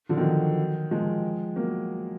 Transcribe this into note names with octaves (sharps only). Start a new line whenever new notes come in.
D3 F3
D#3 F#3
F3 G#3
F#3 A#3